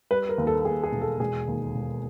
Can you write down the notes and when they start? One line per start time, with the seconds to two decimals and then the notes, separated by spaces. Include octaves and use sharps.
0.11 G3 B4
0.29 A#4
0.38 D#2
0.47 A4
0.65 D#2 G#4
0.83 G#4
0.92 E1
1.01 A4
1.20 E1 G#4
1.48 D#2
1.75 E1